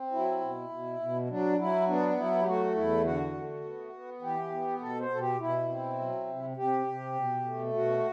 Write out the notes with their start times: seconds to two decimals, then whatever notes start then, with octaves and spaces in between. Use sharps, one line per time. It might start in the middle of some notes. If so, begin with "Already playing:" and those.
Already playing: C4
0.12 F#3 E4
0.41 B2
0.69 B2
1.00 B2
1.29 F#3 D4
1.58 F#3 E4
1.87 B3 D4
2.17 F#3 E4
2.41 G4
2.46 A3 F#4
2.75 E2 E4
3.04 D3 F#4
3.34 A3
3.64 B3
3.93 B3
4.22 E3 G4
4.51 B3
4.81 B2 A4
5.00 C5
5.10 B2 A4
5.19 G4
5.40 B2 E4
5.69 C4
5.99 F#3
6.27 C3
6.56 C3 G4
6.86 C3
7.15 B2
7.45 A3
7.74 B2 F#4